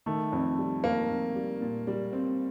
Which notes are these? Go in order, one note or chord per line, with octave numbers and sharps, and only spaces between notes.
D#3 A3
F2
G3
F2 A#3
F2
G3
A#2
G3
C4